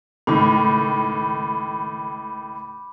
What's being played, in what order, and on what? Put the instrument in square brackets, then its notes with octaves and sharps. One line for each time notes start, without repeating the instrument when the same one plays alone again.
[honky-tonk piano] C#2 A2 D#3 [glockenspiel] B5 D6